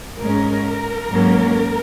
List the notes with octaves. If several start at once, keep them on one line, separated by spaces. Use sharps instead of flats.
G#2 G#3 C#4 A#4
G#2 F#3 A#3 C#4